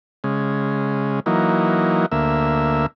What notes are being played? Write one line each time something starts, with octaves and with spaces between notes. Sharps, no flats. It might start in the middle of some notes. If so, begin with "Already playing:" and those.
C#3 G#3
E3 F#3 A#3 D#4
D2 A#3 E5